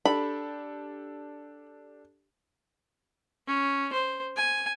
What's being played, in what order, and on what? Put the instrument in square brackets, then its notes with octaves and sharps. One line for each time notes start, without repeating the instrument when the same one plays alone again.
[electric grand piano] D4 G4 A4 [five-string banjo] B5
[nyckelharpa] C#4
C5
G#5